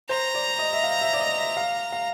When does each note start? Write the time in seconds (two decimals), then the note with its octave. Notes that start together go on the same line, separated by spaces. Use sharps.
0.09 C5 A#5
0.35 D5
0.59 D#5
0.73 E5
0.83 F5
1.01 E5
1.13 D5
1.20 D#5
1.38 E5
1.57 F5
1.92 F5